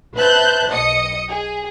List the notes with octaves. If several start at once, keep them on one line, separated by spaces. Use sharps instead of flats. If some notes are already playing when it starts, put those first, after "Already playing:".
B4 C5 E5 A5 F#6 G6
B1 D#5 D#6 C#7
G#4